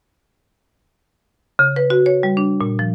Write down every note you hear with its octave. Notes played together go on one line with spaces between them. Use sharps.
C#3
B4
F#4
C#5
G3
D4
A#2
F3